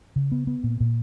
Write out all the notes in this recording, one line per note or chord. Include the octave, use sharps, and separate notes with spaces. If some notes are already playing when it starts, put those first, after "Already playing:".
C#3
B3
B3
A#2
A#2